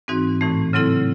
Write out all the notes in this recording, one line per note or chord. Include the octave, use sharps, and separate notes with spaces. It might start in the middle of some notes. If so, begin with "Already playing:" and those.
G#2 E3 C4 D#4 F#4
A2 E3 A3
C#3 F#3 C4 E4 A4